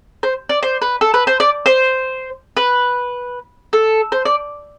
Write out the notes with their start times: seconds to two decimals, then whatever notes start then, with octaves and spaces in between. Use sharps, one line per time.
0.23 C5
0.49 D5
0.63 C5
0.82 B4
1.01 A4
1.14 B4
1.27 C5
1.40 D5
1.66 C5
2.57 B4
3.73 A4
4.12 C5
4.25 D5